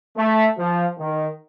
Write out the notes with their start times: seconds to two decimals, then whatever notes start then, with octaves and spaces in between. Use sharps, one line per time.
0.17 A3
0.58 F3
0.98 D#3